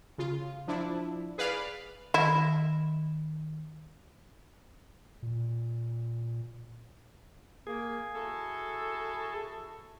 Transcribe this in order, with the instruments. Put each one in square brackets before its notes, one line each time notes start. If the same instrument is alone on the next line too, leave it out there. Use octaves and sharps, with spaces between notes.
[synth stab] C#3 F4
F3 D4 E4
G#4 B4 D5 F5
[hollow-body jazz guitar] D#3 D#5 [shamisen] E4
[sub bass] A#2
[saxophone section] A#3 [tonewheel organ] G#4
[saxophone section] E4 F#4 A4